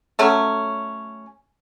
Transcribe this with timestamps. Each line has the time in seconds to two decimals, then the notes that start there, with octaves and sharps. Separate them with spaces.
0.19 F#3 A3 C#4